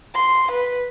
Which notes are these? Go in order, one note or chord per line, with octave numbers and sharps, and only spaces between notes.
C6
B4